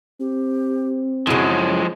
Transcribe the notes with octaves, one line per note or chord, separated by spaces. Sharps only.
C4 G4
F#2 C#3 F3 G#3 E4